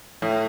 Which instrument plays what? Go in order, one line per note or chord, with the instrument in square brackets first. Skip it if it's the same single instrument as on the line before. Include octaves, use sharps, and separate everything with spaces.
[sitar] A2